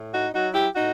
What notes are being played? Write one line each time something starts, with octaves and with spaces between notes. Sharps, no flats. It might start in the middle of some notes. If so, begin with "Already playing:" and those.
Already playing: A2
D#4 F#4
F#3 D#4 F#4
E4 G4
A2 D#4 F#4